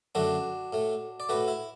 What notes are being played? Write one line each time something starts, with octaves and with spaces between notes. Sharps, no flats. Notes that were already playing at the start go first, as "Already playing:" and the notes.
F#2 D3 A3 D4 F#4
A2 A3
D5
A2 A3 F#4 B4
E4